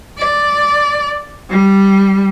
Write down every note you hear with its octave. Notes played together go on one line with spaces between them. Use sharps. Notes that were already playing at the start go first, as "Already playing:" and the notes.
D5
G3